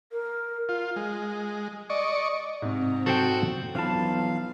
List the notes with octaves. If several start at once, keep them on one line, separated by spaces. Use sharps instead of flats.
A#4
F4
G#3
D5 D#5 C#6
G#2 C3 C4 A#5
F#4 A4 C5 G5
B1 E3 F3 F4 F5 A5 B5